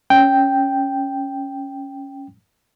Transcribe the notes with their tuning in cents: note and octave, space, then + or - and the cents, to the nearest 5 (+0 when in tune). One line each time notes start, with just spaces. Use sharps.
C#4 +0 G5 +0